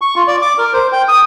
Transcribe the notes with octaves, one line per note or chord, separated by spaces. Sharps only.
C#6
F4
D5
D6
A#4
C5
G5
D#6